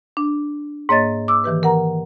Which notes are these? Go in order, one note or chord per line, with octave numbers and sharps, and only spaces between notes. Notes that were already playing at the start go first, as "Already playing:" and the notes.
D4
G#2 A#3 C#5 D#5 A6
D6 E6
D#3 E3 G4 B4
A#4 F#5 A#5